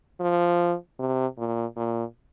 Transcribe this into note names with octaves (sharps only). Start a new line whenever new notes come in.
F3
C3
A#2
A#2